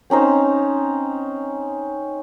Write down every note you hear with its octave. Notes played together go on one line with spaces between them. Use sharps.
C4 C#4 D#4 C5